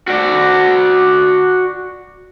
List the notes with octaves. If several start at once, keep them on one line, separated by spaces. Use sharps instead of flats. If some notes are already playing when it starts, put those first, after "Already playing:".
F#4 D5